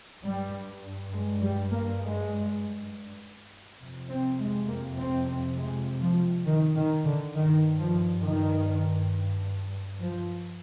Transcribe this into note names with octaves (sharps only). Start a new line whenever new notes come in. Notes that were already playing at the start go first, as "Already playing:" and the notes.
G2 G3
G#3
G3
A#3
G#3
F2 C3
C4
G#3
A#3
C4
C4
G#3
F3
D#3
D#3
D3
G2 D#3
F3
D#3
F3